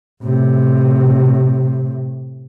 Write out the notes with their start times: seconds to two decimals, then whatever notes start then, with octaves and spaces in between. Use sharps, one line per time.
0.23 A2 C3